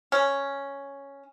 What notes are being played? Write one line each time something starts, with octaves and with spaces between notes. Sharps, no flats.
C#4